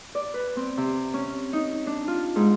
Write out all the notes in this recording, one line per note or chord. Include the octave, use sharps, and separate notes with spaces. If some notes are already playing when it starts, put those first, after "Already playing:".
D5
B4
C4
C3
C#4
D#4
D4
F4
G#2